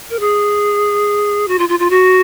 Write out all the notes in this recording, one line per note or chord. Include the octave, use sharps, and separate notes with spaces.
A#4
G#4
F#4
F4
F4
F4
F#4